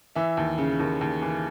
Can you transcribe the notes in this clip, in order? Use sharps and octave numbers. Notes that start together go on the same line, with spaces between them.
E3 E5
D#2
C#3
D#2
D#2
E3